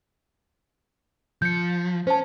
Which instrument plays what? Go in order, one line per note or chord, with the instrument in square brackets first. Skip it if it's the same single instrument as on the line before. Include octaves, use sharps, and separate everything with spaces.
[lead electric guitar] F3 [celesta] G6 C#7
[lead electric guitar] C#4 [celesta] C5 A5